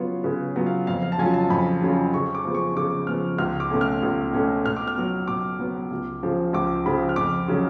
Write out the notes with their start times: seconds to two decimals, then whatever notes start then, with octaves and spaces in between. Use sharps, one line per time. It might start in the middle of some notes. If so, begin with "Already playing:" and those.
Already playing: C#3 F#3 B3 F4 C#5
0.24 C#3 B4
0.56 F#3 B3 F4
0.66 F5
0.87 F2 F5
1.03 F5
1.12 A5
1.18 C#3 F#3 C#4 F4 G#5
1.34 A5
1.50 F2 B5
1.82 C#3 F#3 C#4 F4
2.14 C#3 C#6
2.35 D6
2.45 F3 G#3 B3
2.54 C#6
2.76 C#3 D6
3.07 F3 G#3 B3 F6
3.38 C#2 F6
3.60 D6
3.71 B2 A3 C#4
3.81 F6
4.03 C#2
4.33 B2 A3 C#4
4.65 B2 F6
4.76 D6
4.87 F6
4.97 F#3 B3
5.28 B2 D6
5.59 F#3 B3
5.91 C#2
6.23 C#3 F3
6.53 C#2 D6
6.86 C#3 F3 B5
7.09 F6
7.16 F2 D6
7.48 C#3 F#3 C#4